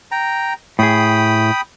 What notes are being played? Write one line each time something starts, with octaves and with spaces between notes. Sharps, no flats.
G5 A#5
A2 G#4 G5 B5 D#6